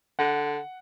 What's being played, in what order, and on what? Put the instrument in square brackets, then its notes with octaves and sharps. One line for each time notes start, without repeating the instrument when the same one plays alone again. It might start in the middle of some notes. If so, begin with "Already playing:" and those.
[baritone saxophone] D3 [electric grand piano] F#5